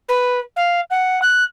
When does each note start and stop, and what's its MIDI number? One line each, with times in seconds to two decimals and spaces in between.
0.08 0.39 71
0.56 0.81 77
0.90 1.20 78
1.22 1.44 90